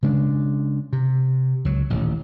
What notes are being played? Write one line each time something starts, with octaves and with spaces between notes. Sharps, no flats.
C#3 G#3 A3 D4
C3
C#2 F#3
D#1 A1